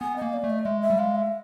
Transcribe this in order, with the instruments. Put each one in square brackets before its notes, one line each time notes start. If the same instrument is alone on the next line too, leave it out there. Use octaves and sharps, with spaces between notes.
[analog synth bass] B3 [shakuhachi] G#5
[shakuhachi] D#5
[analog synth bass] A#3
[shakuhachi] D5
[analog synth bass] A3
[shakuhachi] D#5
[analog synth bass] G#3 [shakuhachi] E5
[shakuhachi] E5
[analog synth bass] G3
[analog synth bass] G#3 [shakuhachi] F5
[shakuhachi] E5